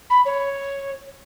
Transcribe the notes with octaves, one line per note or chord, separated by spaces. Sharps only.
B5
C#5